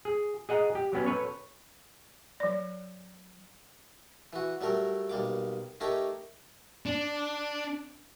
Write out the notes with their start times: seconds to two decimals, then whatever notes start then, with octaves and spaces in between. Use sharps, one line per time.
0.05 G#4
0.49 G#4 D#5 F#5 A#5
0.75 G4
0.93 F#3 B3 C#4
1.06 A4 B4 C#5
2.40 F#3 D5
4.33 E3 F#4
4.61 F#3 G3 A3 A#4
5.10 B1 G3 A#3 D6
5.80 A3 D#4 G4 A#4 C#5 D6
6.86 D4